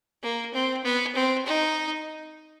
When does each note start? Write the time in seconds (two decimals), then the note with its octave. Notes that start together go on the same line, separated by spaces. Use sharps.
0.23 A#3
0.54 C4
0.84 B3
1.15 C4
1.46 D#4